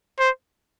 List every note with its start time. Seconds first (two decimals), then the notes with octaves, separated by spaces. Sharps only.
0.19 C5